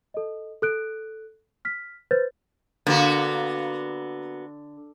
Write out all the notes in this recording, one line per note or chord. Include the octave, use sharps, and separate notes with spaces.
A4 D#5
A4 F#6 D7
F6 B6
B4 C5 G6 A6
D3 A#3 B3 F#4